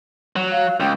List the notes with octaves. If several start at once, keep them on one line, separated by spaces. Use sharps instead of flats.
F#3
F5
C#2 G5